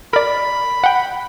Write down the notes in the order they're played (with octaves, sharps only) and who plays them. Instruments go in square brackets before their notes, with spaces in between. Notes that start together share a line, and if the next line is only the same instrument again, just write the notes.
[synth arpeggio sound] A#4 D5 [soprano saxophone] B5
[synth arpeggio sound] F#5 G5